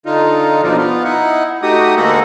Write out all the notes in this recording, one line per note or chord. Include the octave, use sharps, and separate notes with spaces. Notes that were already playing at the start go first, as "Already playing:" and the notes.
D3 D#4 F4
D#2 B2 F3 D4 D#4
B3 F4
D#4 E4 F#5
A3 D#4 F#4 G4 D#6
D2 G#3 A#3 F#4 A4 D#5